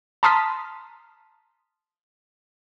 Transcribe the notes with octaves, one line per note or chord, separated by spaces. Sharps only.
A5 A#5 C6 D#6 F6 B6